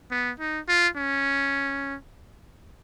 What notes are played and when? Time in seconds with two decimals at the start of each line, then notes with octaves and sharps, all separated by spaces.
0.11 B3
0.39 D#4
0.68 F4
0.96 C#4